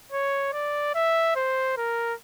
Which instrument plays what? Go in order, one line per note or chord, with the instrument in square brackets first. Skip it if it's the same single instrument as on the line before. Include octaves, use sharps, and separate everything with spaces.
[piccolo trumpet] C#5
D5
E5
C5
A#4